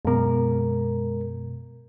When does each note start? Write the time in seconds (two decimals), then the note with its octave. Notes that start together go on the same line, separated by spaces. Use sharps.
0.05 F#2 B2 G#3 A#4